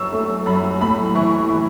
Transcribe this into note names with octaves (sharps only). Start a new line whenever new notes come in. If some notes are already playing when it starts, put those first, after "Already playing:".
Already playing: F#2 C#6 E6
A3
F#2 B5
A2 B5
E3 C#6
E3